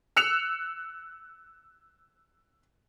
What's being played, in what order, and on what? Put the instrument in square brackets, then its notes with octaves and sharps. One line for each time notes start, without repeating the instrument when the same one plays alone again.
[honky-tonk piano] E6 F#6 C#7 E7 F7